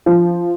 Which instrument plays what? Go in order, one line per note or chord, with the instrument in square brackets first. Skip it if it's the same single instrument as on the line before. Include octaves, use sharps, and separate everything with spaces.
[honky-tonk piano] F3